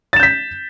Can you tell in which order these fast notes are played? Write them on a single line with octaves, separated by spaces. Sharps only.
A6 E7 G6 B6